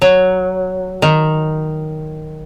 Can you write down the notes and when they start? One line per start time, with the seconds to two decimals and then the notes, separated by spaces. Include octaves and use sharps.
0.02 F#3
1.02 D#3